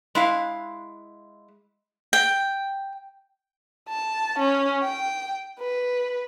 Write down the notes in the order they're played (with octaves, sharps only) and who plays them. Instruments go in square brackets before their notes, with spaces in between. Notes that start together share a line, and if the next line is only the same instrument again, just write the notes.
[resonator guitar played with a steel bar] G#3 E4 F5
[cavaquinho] G5
[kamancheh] A5
C#4
G5
B4